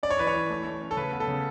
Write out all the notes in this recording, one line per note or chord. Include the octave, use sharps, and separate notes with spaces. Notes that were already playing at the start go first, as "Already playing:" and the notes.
C#4 D5
C#5
E3 B4
C#5
E3
A3
A3
C#4
A4
C#3 B4
B3
A4
C#3